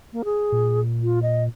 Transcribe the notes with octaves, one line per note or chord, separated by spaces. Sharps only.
A#3
G#4
A#2
F4
D#5